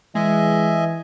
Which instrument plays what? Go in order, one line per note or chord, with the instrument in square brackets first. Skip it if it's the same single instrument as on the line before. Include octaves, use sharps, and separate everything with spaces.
[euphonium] E3 [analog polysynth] G#3 [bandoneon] D#5 E5 G#5